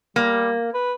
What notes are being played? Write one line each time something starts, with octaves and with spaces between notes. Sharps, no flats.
G3 A#3
B4